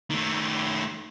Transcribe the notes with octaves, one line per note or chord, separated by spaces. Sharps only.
D#3 A3